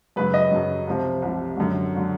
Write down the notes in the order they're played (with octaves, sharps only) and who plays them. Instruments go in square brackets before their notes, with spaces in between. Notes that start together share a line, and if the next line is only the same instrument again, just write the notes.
[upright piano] F#2 C#3 F#3 B4
D#5
F#2 C#3 F#3
C2 C3 F3
C2 C3 F3
F#2 D3 F#3
D3 F#3